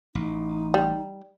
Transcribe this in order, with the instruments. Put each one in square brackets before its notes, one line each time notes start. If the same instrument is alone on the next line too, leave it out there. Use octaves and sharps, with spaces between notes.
[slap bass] A1 [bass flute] D#4
[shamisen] G3